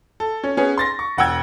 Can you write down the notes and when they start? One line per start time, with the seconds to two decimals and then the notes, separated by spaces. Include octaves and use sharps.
0.20 A4
0.43 C#4
0.57 B3 C#4 G#4
0.78 C6 A6 A#6
0.99 C#6
1.17 E1 F#5 G5 E6 G#6